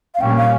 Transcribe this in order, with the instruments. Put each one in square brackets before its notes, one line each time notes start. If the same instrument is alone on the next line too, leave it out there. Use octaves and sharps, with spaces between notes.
[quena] F5
[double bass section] A#2 G3 A#3 C#4 [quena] G5
[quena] F5